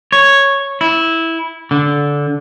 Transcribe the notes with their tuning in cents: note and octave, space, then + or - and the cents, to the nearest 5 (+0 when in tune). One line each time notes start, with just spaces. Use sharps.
C#5 -5
E4 -10
D3 -15